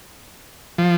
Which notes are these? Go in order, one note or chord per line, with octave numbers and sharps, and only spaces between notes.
F3